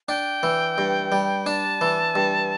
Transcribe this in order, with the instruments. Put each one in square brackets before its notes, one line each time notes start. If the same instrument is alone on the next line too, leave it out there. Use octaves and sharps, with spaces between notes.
[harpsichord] D4 [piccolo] G5
[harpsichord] E3
G2
G3
[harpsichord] D4 [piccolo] A5
[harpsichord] E3
G2